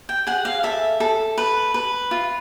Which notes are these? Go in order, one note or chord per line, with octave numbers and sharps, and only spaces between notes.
G5
G#4 F#5
F5
A4 E5
A4
B4
B4
F4